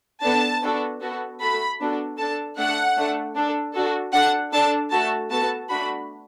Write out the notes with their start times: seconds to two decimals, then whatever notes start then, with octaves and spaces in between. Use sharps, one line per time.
0.22 B3 D4 A4 A5
0.63 B3 D4 F#4 A4
1.01 B3 F#4 A4
1.39 A3 F#4 A4 B5
1.80 B3 D4 F#4 A4
2.18 D4 A4 A5
2.57 A3 D4 A4 F#5
2.97 A3 D4 A4
3.35 D4 A4
3.73 D4 F#4 A4
4.13 D4 A4 F#5
4.52 D4 A4 A5
4.91 A3 F#4 A4 A5
5.30 B3 F#4 A4 A5
5.69 A3 D4 F#4 B5